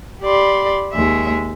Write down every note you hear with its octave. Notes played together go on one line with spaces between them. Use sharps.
G4 D5 B5 C6
D#2 G#3 E5